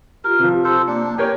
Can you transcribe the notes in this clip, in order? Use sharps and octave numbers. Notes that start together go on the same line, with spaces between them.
F4 G4 A#4
C3 F3
A4 C5
A#3 D4 A5
G4 A#4 C#5 G5 G#5